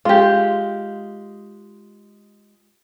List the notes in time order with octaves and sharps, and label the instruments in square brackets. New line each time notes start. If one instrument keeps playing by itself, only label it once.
[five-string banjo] G#3 G4 [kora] F4